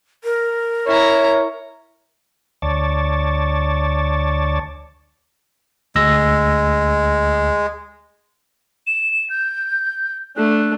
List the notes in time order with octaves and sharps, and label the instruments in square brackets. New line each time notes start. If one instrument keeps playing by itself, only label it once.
[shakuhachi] A#4
[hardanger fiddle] E4 A#5 [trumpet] C#5
[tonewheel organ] D2 C#5 D5 A5
[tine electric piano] D2 E6 A#6 [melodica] G#3
[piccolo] E7
G6
[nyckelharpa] A3 D4 [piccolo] F#6